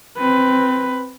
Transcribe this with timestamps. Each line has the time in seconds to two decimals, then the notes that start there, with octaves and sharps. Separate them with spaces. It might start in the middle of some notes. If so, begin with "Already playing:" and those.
0.18 C4 B4